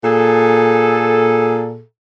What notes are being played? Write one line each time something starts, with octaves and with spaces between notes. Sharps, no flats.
A#2 G#4 A4